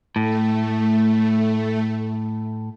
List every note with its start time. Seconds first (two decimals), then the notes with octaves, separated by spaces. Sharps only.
0.16 A2 A3